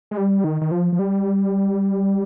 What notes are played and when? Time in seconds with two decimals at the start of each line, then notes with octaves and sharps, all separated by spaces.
0.11 G#3
0.17 G3
0.44 D#3
0.61 D#3
0.71 F3
0.92 F3
0.99 G3